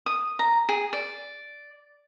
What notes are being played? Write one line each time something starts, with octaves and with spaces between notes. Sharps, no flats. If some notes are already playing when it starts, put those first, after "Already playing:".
D#6
A#5
G#4
D5